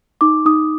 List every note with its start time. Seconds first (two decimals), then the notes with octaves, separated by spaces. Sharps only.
0.21 D#4 D6
0.46 D#4 D#6